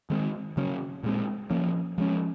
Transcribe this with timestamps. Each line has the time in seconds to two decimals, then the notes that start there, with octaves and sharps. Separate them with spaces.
0.10 D#3 G#3 C4
0.57 C#3 F#3 C#4
1.03 A#2 G#3 C4
1.50 F3 A#3 C#4
1.98 F3 G#3 C#4